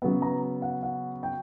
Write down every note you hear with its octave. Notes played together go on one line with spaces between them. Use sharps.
C#3 F#3 B3
A#5
F#5
F#5
G5